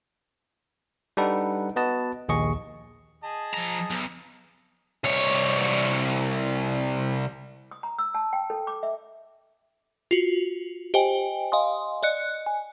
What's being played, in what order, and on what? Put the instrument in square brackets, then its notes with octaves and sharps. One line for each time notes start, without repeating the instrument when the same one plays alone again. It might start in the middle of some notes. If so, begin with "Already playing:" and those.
[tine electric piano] G3 D4 D#4 A4 B4 F#5
B3 F#4 B4 D#5 A5
A#1 D#2 G#4 D#5 C#6
[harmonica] G#4 D#5 A5
[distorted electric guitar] F3 A#5
B1
[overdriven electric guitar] C2 C#5
[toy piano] D#6
A#5
E6
A5
G5
A4
D6
E5
[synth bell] F4 F#4
G4 C5 D#5 G5 G#5
D#5 F5 G#5 C6 D#6
D5 D#5 F#6 C#7
G#5